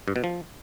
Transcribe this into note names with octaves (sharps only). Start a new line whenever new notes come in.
G2
B2
F3